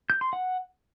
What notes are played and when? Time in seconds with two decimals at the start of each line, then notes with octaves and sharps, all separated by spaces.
0.10 G6
0.21 C6
0.33 F#5